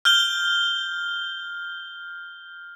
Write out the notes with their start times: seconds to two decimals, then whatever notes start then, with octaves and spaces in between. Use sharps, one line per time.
0.05 F6 G6 G7